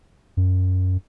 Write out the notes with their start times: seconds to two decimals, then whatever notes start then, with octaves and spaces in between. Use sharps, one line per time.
0.37 F#2